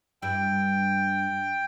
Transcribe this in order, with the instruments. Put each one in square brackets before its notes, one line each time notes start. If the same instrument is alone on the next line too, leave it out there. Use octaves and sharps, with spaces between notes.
[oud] G2 E4 [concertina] G5